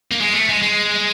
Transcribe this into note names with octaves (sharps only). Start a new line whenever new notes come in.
A#3
G#3
A3
G#3
G#3